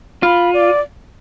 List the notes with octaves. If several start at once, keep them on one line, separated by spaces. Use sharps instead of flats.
F4 B5
D5